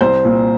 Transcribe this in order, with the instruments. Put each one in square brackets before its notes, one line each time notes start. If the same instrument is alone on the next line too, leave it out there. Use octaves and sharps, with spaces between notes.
[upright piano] C2 C5
A#2